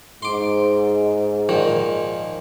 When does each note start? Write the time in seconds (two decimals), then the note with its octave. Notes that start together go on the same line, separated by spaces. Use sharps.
0.22 G#2 C6 D6
1.49 A#2 D#3 F3